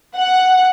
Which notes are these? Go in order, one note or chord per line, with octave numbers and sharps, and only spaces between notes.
F#5